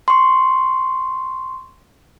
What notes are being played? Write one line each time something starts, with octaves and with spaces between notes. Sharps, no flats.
C6 C#6